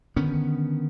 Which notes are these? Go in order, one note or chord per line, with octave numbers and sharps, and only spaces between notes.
D3 D#3 B3 C#4